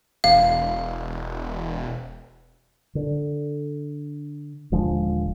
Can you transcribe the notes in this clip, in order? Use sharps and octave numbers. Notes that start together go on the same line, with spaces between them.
E1 F5
D3
D#1 D3 F3 G#3